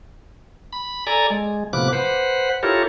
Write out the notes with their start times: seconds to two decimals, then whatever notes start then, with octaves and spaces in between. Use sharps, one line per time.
0.73 B5
1.07 A4 D5 G#5 A#5
1.30 G#3
1.73 A2 C3 F3 B3 D6 F#6
1.93 B4 C5 F#5
2.63 E4 F4 G4 A4 A#4 C#5